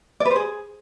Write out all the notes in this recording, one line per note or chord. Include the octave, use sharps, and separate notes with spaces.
D5
B4
C5
G#4